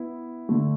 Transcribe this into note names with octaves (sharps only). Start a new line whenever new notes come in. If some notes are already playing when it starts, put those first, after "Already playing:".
Already playing: B3 E4
D3 A3